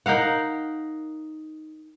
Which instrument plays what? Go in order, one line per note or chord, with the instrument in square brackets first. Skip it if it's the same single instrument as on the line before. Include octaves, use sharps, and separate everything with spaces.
[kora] D#4 A#4 F5 F#5